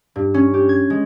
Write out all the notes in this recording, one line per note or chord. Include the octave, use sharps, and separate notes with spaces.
G2
C#4
G4
G#6
G#3